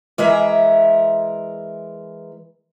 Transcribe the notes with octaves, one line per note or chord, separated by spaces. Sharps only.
E3 G#3 A#4 E5